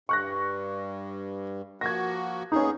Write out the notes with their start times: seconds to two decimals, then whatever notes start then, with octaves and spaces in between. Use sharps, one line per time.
0.09 G2 C#6 F#6 A#6
1.81 F3 A#3 F#4 G#6 A#6
2.52 D#2 B3 C#4 D#4 G#4